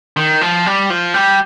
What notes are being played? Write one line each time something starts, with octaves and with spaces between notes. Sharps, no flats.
D#3
F3
G3
F3
G3